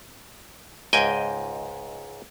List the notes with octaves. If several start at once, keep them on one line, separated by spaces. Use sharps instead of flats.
C#2 G#2 D#5 G5 G#5